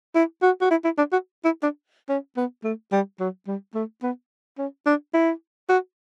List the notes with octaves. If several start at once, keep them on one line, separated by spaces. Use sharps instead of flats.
E4
F#4
F#4
E4
E4
D4
F#4
E4
D4
C#4
B3
A3
G3
F#3
G3
A3
B3
C#4
D4
E4
F#4